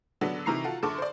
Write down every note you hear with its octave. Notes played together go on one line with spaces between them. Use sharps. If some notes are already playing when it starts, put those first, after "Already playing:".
D3 F#3 B3 D4
C3 D#3 E3 A#5 C#6 C7
F4 F#4 A4
F#2 D3 A5 C#6 D6
C5 D5